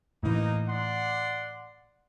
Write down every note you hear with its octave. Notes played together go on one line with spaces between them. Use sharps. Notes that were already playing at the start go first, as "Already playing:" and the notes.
A2 E3 A#3 D#4
D5 F#5 C6